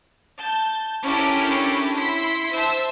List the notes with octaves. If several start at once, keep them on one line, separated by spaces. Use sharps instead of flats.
A5 G6
C#4 D4 E4 G4 A4 A#4
E4 C6 B6
C5 E5 A5 E6